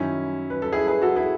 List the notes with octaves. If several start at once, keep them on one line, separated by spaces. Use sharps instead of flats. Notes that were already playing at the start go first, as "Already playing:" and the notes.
Already playing: F#2 D#3 F#3 C#4 E4
B4
A4
E4 G#4
G#4 B4
F#4 A4
E4 G#4